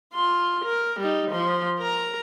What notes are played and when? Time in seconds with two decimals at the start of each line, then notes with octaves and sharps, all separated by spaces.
0.14 F4 C6
0.64 A#4
1.00 G3 D#4
1.31 F3 C6
1.79 A#4 A#5